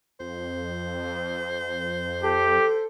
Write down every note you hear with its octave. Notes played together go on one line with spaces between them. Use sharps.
F2 C5
G4 A4